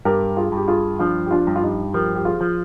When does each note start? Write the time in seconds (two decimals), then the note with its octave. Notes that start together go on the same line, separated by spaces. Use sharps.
0.05 G2 G4 A#4
0.37 F4 G#4
0.52 G2 G4
0.68 F4 G#4
0.99 F3 D4 F4
1.26 G4
1.31 D4 F4
1.47 G2
1.56 F4
1.62 D#4 G4
1.93 F3 G4 A#4
2.15 G4
2.25 F4 G#4
2.41 F3